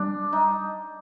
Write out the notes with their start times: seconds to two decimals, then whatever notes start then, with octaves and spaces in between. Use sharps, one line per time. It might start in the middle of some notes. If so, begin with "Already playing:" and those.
Already playing: G3 D4
0.33 D#4